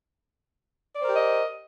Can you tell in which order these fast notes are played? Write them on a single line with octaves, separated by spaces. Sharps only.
D5 C5 A#4 G4 D#5